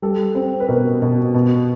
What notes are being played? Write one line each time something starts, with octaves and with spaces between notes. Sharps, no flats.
G3 A4
C4
B4
B2 A#4
B2
B2